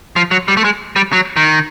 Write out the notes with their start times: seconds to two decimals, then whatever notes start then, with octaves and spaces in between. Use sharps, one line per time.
0.16 F3
0.31 F#3
0.48 G3
0.57 A3
0.64 G#3
0.96 G3
1.13 F#3
1.36 D#3